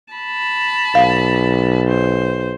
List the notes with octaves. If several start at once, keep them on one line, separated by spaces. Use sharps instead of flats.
A5 B5
B1 F5
C5